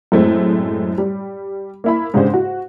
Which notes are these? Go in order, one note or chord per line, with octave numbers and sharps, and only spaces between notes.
F#2 A2 G#3 A3 C4
G3
A#3 E4 B5
G#2 C#3 D4 G4 C5
F#4